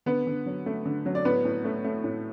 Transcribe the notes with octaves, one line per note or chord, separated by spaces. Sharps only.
D3 B3 B4
D3
F#3
A3
D3
F#3
D5
A2 B3 B4
A2
A3
A3
A2